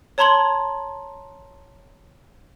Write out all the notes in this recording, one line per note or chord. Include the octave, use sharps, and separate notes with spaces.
C#5 A5 A#5 C6 G#6 F#7